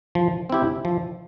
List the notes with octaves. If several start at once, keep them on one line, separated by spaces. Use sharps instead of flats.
F3
C4 E4 G4
F3